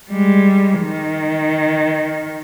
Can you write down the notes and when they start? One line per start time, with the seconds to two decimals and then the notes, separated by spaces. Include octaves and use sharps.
0.11 G3 G#3
0.81 D#3